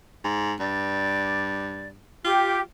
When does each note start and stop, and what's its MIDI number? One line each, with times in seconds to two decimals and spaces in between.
0.24 0.53 44
0.60 2.07 43
0.60 1.88 74
2.24 2.60 65
2.24 2.60 67